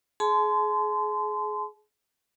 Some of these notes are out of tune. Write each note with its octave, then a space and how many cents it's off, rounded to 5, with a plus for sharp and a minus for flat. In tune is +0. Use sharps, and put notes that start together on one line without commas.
G#4 +25 A5 -40 C6 -25